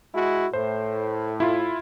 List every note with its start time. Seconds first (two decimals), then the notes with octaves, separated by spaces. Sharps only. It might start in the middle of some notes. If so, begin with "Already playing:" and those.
0.15 G#3 E4 F#4
0.53 A2 C5
1.40 E4 F4